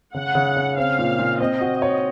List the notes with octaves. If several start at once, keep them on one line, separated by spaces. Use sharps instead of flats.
C#3 F#5
C#3
C#3
C4 F5
A#2
A#2
C4 D#5
F#4
C#5